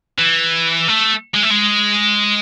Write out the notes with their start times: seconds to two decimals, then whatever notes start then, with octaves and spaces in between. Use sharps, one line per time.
0.19 E3
0.88 A3
1.35 G#3
1.43 A3
1.51 G#3